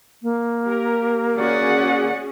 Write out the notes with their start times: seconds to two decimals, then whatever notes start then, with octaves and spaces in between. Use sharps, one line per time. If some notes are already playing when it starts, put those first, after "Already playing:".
0.23 A#3
0.64 G4 A#4
1.37 C#4 F#4 G#4 D5 F#5